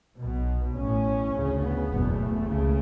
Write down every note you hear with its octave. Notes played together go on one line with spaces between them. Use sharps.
B1 B2
A1 A2 C#4
D2 C#3
B3
F#1 E2 B2
A3
C#2 C#3